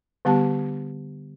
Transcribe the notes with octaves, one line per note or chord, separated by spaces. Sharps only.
D3 G3 B3 G4 A5